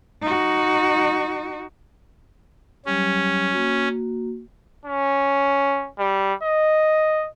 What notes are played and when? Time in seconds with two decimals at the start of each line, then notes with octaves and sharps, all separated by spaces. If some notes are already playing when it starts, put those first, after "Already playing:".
0.22 D#4 F#4
2.86 F#3 G3 C#4 G4
3.52 A#3 F#4
4.86 C#4
5.99 G3
6.43 D#5